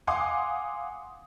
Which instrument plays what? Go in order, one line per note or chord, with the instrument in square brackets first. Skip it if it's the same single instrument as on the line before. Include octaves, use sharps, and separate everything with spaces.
[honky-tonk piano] F5 F#5 G#5 C6 D6 D#6